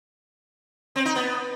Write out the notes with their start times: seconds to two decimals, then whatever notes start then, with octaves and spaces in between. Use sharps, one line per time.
0.96 C4
1.05 D#4
1.15 B3